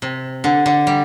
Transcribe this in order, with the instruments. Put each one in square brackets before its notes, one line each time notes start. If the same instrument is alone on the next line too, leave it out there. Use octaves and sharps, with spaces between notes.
[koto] C3
D3
D3
G3